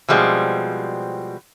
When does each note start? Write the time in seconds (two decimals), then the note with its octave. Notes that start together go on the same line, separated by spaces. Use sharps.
0.09 B2 F3 G3 G#3 C4